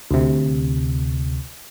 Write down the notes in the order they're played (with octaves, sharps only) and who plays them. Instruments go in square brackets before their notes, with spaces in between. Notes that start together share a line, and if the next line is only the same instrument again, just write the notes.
[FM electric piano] D2 C3